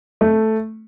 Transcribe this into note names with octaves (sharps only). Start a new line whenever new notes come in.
A3